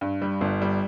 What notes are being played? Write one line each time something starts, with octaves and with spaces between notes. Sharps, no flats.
G2
G3
G1
G3